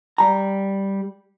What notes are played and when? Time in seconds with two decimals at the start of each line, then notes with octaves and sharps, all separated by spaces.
0.18 G3 A#5